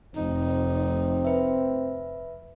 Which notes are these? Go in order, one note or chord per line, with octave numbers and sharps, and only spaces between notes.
F1 C4 D#4
B4 E5